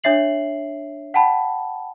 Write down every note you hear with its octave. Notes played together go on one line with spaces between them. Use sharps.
D4 C#5 E5 C7 F#7
F#5 G5 A5 B5